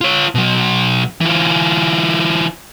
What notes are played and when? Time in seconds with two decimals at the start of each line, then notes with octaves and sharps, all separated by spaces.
0.01 F4 C#5
0.35 B2 F#3
1.21 E3 F4